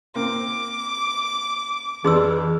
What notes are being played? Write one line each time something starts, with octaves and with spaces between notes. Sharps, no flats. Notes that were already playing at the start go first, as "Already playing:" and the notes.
A#3 C4 D6
F2 E3 D4 G#4 C6 E6